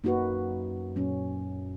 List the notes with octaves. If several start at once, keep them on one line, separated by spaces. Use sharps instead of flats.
F#2 A#3 D#4 F#4 B4
A#2 F#3 C#4